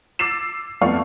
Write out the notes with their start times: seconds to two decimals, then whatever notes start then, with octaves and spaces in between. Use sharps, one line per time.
0.19 D6 E6 A6 C7 E7
0.81 F2 A3 B3 D5 F5 C#6